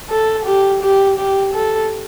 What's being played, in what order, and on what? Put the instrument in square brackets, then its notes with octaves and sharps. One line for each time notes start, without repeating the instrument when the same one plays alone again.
[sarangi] A4
G4
G4
G4
A4